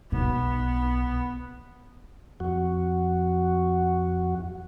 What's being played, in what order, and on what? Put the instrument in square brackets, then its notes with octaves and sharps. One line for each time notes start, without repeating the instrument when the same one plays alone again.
[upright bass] B1 [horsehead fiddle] B3
[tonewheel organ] F2 F#4